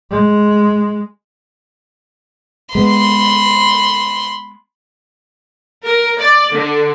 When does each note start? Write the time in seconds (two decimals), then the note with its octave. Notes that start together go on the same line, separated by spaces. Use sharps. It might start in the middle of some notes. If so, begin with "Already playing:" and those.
0.11 G#3
2.75 G#3 B3 B5 C6
5.85 A#4
6.19 D5
6.53 D3